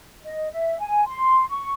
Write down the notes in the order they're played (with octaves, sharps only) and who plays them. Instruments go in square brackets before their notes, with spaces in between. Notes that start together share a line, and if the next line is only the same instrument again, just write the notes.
[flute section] D#5
E5
G#5
C6
C#6